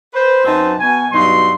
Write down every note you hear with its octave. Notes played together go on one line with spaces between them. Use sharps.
B4 C5
F#2 F#3 C4 D#4 B4 A5
B2 G#5
G2 B2 F#3 D#4 C6